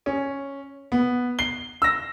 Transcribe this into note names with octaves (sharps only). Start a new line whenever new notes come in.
C#4
B3
C7 G7
E6 A#6